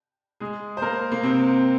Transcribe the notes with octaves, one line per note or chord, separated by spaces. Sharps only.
G#3 G#4
C5
A#3 A#4
A#3
C3 C4